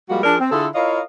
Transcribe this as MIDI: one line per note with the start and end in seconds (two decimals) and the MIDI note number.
0.09 0.20 53
0.09 0.20 55
0.09 0.20 56
0.09 0.20 58
0.09 0.20 66
0.23 0.35 53
0.23 0.35 62
0.23 0.35 68
0.23 0.35 70
0.23 0.35 74
0.39 0.51 60
0.51 0.67 50
0.51 0.67 64
0.51 0.67 65
0.51 0.67 68
0.51 0.67 69
0.75 1.00 64
0.75 1.00 65
0.75 1.00 70
0.75 1.00 73
0.75 1.00 75
0.75 1.00 77